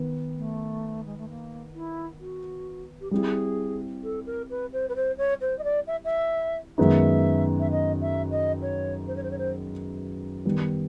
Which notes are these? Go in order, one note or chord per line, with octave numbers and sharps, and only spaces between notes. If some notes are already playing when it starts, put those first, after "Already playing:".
Already playing: D#3 B3
A3
G#3
A3
A#3
E4
F#4
G4
G3 C4 E4 G#4
A4
A#4
B4
C5
B4
C5
C#5
C5
D#5
D5
E5
E5
F#2 D#3 G#3 B3 D#4 E5
E5
D#5
E5
D#5
C#5
C5
C#5
C5
C#5
C5
D#3 G3 B3